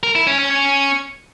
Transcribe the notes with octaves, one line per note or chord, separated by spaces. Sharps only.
A#4
E4
C#4
C#4
C#4